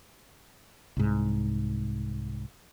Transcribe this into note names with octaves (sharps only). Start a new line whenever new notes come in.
C2 G#2